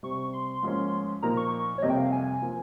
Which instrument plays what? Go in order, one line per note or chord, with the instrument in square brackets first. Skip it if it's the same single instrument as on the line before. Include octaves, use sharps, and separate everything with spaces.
[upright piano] C3 G3 C4 [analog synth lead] C#6
[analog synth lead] C6
[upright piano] G#2 F3 A#3 C#4
[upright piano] A#2 F3 A#3 D#4 A#4 [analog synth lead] A#5
[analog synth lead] C#6
C#5
[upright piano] F2 C3 G3 A#3 [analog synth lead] D#5
[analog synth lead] G5
F5
G#5
[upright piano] F3 A#3